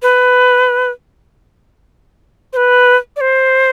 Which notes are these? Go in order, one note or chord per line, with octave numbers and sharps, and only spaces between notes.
B4
C5
B4
D5
C5